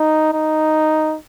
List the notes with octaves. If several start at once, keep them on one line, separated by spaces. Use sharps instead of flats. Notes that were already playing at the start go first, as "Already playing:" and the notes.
Already playing: D#4
D#4